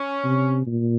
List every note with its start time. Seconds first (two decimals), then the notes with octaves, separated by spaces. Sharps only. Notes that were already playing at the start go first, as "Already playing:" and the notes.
Already playing: C#4
0.24 C3
0.67 A#2